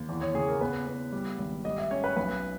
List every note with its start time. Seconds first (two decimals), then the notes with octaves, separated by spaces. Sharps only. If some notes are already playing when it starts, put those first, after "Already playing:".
Already playing: D#2
0.09 E2
0.21 C#5
0.34 C#3 G#4
0.48 A#4
0.61 B3 B4
0.87 B3
1.12 G3
1.38 G#1
1.64 G3 D#5
1.78 E5
1.91 C#4 C#5
2.04 B4
2.16 B1 B4